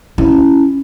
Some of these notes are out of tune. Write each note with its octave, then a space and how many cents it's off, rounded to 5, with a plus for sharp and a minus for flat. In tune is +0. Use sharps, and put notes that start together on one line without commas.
C#4 +0 E4 +0